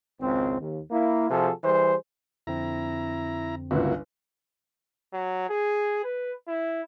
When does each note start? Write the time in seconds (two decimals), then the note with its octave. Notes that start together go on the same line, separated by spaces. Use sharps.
0.21 G#1 C#2 C4
0.59 D#2
0.91 A#3 E4
1.30 C3 F3 F#4 G#4 A4
1.64 E3 G3 G#4 C5
2.47 F2 D3 C4 E4 A#5
3.71 G1 C#2 A#3 E4 F#4
5.13 F#3
5.49 G#4
6.04 B4
6.48 E4